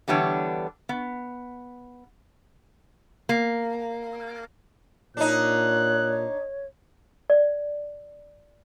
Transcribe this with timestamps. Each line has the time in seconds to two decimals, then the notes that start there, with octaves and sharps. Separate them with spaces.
0.08 D3 E3 G3 B3 D4 C#5
0.89 B3
3.29 A#3
5.17 A#2 D4 D#4 C#5 F#6
7.30 D5